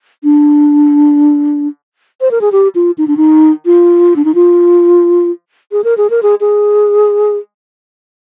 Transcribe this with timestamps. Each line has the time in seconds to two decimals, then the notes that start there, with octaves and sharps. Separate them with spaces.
0.24 D4
2.21 C5
2.31 A#4
2.41 G#4
2.52 G4
2.75 F4
2.98 D#4
3.07 D4
3.17 D#4
3.66 F4
4.16 D4
4.25 D#4
4.35 F4
5.72 G#4
5.84 A#4
5.97 G#4
6.10 A#4
6.23 G#4
6.41 G#4